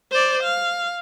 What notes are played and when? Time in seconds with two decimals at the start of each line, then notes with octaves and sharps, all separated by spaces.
0.11 C5 D5
0.43 F5